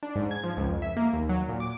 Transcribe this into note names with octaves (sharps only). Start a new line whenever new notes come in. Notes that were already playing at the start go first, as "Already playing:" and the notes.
D4
G#2
G#6
F3
C#2
F2
E5
A#3
D#2
F#3
A#2
D6